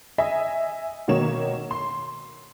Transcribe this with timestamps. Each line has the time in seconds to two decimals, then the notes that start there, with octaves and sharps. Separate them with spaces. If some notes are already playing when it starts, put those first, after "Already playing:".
0.18 D#5 E5 G#5
1.08 B2 D#3 A#3 C#5 E7
1.71 C6